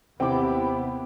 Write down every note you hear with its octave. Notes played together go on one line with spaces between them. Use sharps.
D#2 C3 B3 C4 E4 G5 D6